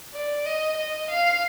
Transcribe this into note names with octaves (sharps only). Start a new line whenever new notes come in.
D5
D#5
D#5
F5